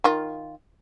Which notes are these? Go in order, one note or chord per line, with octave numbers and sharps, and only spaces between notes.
D#3 F4